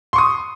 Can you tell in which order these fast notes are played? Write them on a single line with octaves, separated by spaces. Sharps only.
C6 C#6 D#6